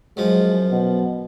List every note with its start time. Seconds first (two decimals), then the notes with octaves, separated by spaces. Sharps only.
0.17 F#2 F3 G#3
0.71 B2